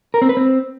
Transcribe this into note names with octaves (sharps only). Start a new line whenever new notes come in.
A#4
C4
B4
C4